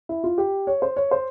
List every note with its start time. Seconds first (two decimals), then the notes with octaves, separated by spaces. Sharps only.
0.09 E4
0.24 F4
0.38 G4
0.67 C#5
0.82 C5
0.96 C#5
1.11 C5